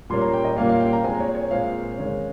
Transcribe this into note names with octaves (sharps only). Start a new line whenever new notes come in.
A#2 G3 A#3 C#4 C6
A#5
G5
D#5
A#2 G3 A#3 C#4 F5
F5
G5
A#5
A#2 G#3 C4 G#5
C#5
C#5
A#2 G#3 C4 F5
D#3 G#3 C#4